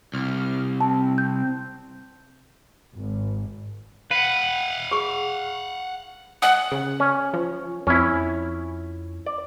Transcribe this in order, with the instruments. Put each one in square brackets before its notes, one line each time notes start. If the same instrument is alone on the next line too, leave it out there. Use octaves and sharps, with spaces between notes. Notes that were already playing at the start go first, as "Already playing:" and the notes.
[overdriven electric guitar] C2 [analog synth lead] F6
[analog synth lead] C4 [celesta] A5
[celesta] G6
[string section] G#1
[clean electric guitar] B4 [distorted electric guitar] F5 F#5
[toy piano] G#4 C#6
[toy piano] D#5 G#5 D#6 [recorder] F#5
[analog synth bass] C#3
[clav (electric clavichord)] C#4
[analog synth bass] F3
[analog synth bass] F2 [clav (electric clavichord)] C#4 E4
[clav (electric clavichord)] D5